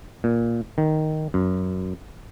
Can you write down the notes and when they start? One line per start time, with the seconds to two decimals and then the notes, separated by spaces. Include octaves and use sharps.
0.24 A#2
0.78 D#3
1.34 F#2